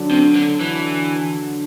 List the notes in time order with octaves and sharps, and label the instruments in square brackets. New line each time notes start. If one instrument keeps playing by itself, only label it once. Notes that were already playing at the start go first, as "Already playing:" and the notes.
Already playing: [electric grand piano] D3 F#3 D4
[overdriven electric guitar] C3 [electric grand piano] D4
[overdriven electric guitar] D3
E3